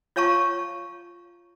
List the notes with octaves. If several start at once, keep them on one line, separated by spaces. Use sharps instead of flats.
F4 C#5 F5 A5 A#5 C#6